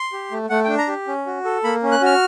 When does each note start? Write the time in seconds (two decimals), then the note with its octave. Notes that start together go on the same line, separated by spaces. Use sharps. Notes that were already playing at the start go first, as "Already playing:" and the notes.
Already playing: C6
0.13 G4
0.31 A3
0.50 A3 F#5
0.64 D4 G5
0.78 A#5
0.88 G4
1.07 C#4
1.26 F#4
1.45 A4
1.64 A#3 B5
1.83 C#4
1.92 F#6
2.02 F#4 F6